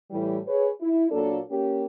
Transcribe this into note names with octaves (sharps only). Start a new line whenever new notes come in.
A2 E3 G3
G#4 B4 C#5
E4
A#2 F#3 A#3 D4 A4
A#3 C#4 G4